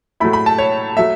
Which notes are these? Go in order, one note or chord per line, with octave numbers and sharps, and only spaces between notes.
A2 F#3 A3 E4 B5
B5
A5
C#5
F#3 A3 E5